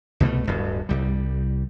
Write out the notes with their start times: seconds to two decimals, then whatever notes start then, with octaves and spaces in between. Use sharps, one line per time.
0.20 C2 B2 F#3 A3
0.47 D1 G2
0.89 C2 G3